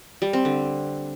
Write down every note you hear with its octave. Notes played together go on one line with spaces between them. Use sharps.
G3
C4
D3